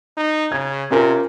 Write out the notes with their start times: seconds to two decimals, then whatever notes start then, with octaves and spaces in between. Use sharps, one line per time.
0.17 D#4
0.52 C#3 G#6
0.91 C3 C#4 F4 A#4